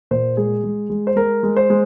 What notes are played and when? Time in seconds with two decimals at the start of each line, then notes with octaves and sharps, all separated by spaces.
0.11 A#2 C5
0.37 G#3 G#4
0.64 G#3
0.90 G#3
1.07 C5
1.16 G#3 A#4
1.43 G#3
1.57 C5
1.70 G#3